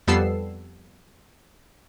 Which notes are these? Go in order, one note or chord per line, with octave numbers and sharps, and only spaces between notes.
F2 G3 B3 A4 E6 C7